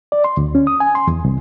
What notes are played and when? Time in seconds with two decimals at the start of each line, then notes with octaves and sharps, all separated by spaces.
0.12 D5
0.24 C6
0.37 D2
0.55 C#4
0.67 D#6
0.80 G#5
0.95 C6
1.07 E2
1.25 C2